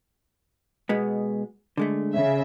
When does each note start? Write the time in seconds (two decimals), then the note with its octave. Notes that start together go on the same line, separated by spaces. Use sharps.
0.89 B2 G#3 B3
1.77 D3 G#3 A3
2.13 C#3 E5